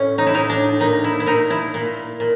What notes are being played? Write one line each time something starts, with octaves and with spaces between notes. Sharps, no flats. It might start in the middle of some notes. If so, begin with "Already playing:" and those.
Already playing: A2 C#4
D#4
E4
A2 D#4
D4
A#2 D#4
E4
E4
A#2 D#4
E4
A#2
A#2